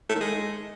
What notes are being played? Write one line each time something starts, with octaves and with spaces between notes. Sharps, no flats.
A3
D#3
G#3